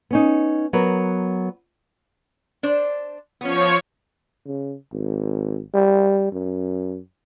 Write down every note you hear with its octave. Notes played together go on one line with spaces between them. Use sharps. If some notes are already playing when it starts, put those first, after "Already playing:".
B3 C#4 D#4
F#3 B3 A#4 B4
D4 C5 D5
F3 B3 C#4 C#5 C#6
C#3
G#1
G3
F#2